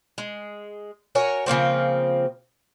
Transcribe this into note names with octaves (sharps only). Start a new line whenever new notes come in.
G#3
F#4 A#4 C#5 G#5
C#3 F3 A#3 C4